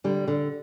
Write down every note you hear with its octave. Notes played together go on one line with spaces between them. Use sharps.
D3 G3
D3